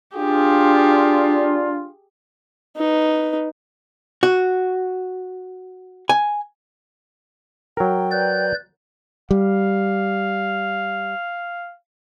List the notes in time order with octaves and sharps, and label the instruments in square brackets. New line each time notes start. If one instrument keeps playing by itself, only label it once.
[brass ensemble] D4 F4 [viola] G4 G#4
[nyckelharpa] D#4 B4
[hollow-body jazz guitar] F#4
G#5
[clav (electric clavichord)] F#3 A#4 [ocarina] G5
[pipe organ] B4 D5 G6
[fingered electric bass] G3 [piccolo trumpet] F5